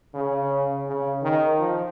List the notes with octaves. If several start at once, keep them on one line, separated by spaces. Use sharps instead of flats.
C#3
C#3
D#3
F3